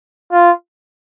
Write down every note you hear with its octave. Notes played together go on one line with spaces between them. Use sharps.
F4